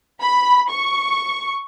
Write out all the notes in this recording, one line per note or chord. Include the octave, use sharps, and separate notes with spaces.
B5
C#6